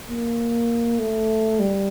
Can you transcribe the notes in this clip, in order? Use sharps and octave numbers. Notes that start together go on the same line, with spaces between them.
A#3
A3
G3